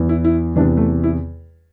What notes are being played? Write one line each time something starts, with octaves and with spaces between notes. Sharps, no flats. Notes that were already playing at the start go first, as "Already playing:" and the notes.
Already playing: E2 E3
E4
E4
E2 C3 E3 D4
A3
E4